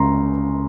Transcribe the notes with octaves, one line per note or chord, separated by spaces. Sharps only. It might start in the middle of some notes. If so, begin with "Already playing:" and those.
Already playing: C#2 C#3 A#5 C6